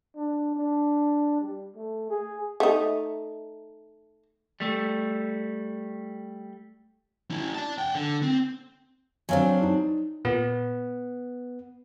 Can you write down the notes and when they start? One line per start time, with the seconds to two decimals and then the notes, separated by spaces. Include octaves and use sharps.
0.16 D4
0.56 D4
1.41 G3
1.75 A3
2.10 G#4
2.60 A3 D#4
4.60 G3 A3
7.31 C#4 E4
7.55 D5 A5
7.78 F#5 G5
7.95 D3
8.22 C4
9.29 F#3 C4 D4 C5 F5 G#5
9.62 D#4
10.25 A#2 B3